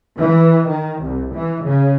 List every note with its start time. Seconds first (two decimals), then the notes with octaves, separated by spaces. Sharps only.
0.16 E3
0.67 D#3
1.02 C2
1.34 E3
1.65 C#3